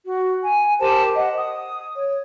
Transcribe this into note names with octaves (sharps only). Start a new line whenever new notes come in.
F#4
G#5
G4 A#4 C5 A5
D#5 F#5
D#6
C#5